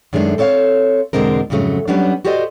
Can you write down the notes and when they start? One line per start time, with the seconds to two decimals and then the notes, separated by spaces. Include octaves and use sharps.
0.13 F#2 D#3 G#3 A3 D4
0.38 C4 A4 C#5 E5 F5
1.13 E2 B2 D3 G#3 C4 A#4
1.50 F2 G#2 C#3 F#3 A3
1.88 F#3 G3 B3 C#4 D4
2.25 F#4 G4 A4 C5 D5 D#5